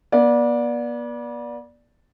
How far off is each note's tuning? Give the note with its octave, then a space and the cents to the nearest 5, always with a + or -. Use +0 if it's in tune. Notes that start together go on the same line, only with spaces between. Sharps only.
B3 -40 D5 +0